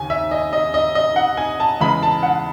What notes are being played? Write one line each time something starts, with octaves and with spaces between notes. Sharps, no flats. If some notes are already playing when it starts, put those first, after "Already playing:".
Already playing: D#2 C#3 G#5
E5
D#5
D#5
D#5
D#5
F#5
G#5
A5
E2 C#3 G#3 B5
A5
F#5